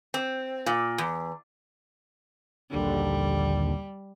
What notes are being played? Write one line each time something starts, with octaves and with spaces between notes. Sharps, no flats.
C4
A#2
E2
A#1 D#2 D3 G3